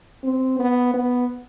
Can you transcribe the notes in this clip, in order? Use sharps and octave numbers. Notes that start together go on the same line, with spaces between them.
C4
B3
B3